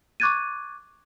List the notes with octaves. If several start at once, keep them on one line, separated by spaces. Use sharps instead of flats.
C#6 D6 F#6 G#6 A6 D#7